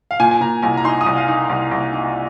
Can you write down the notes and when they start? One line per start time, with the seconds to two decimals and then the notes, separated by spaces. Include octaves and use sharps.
0.11 F5
0.20 A#2 G#5
0.31 G#5
0.41 A#2 A#5
0.62 C2 G#5
0.77 A#5
0.84 D#4 C6
1.01 D#6
1.06 C2
1.17 F5
1.28 D#4
1.50 C2
1.71 C2
1.93 D#4